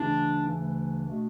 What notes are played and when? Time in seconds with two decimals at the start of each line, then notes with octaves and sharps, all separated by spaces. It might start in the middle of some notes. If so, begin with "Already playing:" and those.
Already playing: D2 C#3 E3 D4
0.48 D2 C#3 E3 D4
1.07 B2 A3